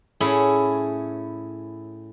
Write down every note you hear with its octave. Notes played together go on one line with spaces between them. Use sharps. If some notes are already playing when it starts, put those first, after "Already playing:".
A2 C#4 E4 G#4